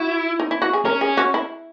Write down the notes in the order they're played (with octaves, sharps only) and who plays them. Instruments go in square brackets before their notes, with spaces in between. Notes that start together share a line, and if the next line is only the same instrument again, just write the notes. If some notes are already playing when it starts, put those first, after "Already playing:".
Already playing: [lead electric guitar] E4 [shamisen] F#4
[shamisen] D#4
E4
F#4
G#4
[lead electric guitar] C#4 [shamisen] A#4
[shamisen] G#4
F#4
E4